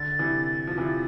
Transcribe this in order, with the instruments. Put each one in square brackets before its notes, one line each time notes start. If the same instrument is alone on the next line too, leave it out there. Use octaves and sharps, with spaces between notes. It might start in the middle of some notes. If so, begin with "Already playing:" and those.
Already playing: [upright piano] D3 [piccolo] A6
[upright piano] C3 E3
F3
C3 E3